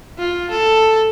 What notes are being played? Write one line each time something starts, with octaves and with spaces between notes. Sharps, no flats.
F4
A4